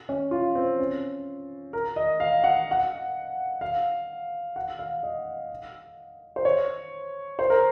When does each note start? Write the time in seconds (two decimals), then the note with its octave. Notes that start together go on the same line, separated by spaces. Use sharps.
0.09 C#4
0.31 F4
0.55 C4
0.79 C#4
1.73 A#4
1.96 D#5
2.20 F5
2.44 F#5
2.71 F#5
3.61 F5
4.56 F#5
4.79 F5
5.03 D#5
6.36 C5
6.45 C#5
7.39 C5
7.50 A#4